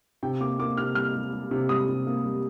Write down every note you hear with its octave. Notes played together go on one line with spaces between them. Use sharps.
C3 G5
A#3 D6
A#3 D6
C3 F6
G3 F6
G3
G3
C3
G3 D#6
C3
A#3
G3